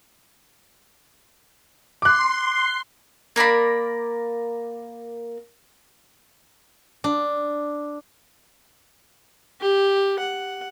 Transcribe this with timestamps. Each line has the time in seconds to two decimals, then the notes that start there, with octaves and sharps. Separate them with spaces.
2.02 C6 D6 F#6
3.36 A#3 A#4 D5 B5
7.04 D4
9.61 G4
10.20 F#5